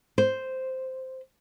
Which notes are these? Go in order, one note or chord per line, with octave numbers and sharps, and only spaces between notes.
C5